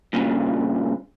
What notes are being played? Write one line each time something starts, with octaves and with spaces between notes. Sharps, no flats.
G2 A#2 C#3